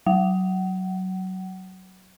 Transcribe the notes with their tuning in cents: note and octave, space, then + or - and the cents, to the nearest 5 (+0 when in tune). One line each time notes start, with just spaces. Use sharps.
F#3 +15 F#5 +35